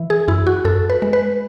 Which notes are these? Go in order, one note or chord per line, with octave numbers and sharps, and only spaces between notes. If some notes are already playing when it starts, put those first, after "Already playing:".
Already playing: E3
G#4
F#2 E4
F#4
F#2 A4
B4
G#3
B4